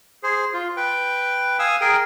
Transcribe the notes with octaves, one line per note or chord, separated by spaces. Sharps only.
G#4 C5
F4
B4 G5
F5 G#5 D#6 E6
G#4 A#4 G5